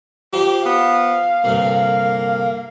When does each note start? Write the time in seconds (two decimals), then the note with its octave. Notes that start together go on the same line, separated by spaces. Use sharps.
0.33 F3 G4 C5
0.65 B3 F5
1.44 C2 G2 D3 A#3